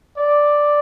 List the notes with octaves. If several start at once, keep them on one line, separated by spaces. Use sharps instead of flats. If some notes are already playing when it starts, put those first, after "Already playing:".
D5